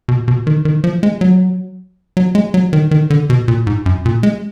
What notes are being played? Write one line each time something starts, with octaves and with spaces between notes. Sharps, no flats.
B2
B2
D#3
D#3
F3
G#3
F#3
F#3
G#3
F#3
D#3
D#3
D3
B2
A#2
G#2
F#2
A#2
G#3